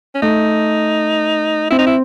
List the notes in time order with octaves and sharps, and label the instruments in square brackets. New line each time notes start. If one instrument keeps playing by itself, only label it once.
[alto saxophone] C#4
[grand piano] A3 [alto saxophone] D#4
[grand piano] C4 [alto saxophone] E4
[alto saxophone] D#4
E4